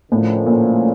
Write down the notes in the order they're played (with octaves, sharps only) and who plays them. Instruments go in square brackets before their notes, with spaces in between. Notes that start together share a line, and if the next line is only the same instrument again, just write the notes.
[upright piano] A2 [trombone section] D3 F3 A#3 C#4
[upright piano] A#2